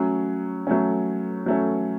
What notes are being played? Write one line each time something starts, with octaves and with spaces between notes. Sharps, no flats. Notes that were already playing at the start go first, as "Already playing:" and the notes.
Already playing: F#3 A3 C#4
F#3 A3 C#4
F#3 A3 C#4